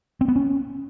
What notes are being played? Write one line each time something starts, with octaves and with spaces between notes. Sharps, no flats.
C4
B3
C#4